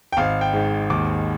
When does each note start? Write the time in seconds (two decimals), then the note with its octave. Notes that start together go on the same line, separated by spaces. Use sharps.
0.12 G5
0.17 G#1 F5
0.41 G5
0.53 G#2
0.90 D#2 D6